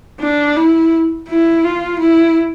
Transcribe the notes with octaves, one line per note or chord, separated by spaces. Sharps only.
D4
E4
E4
F4
E4